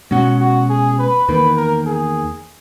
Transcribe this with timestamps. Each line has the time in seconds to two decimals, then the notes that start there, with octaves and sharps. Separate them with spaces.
0.11 B2 G#3 C#4 F#4
0.40 F#4
0.70 G#4
0.99 B4
1.28 E2 D#3 A#3 B4
1.57 A#4
1.86 G#4